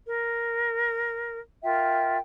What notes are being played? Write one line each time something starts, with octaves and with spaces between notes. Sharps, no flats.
A#4
F4 A#4 E5 G5